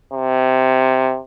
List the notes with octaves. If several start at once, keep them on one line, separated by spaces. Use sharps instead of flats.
C3